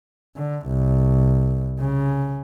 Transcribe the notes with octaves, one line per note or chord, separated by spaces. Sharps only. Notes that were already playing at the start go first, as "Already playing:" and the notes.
D3
C2
C#3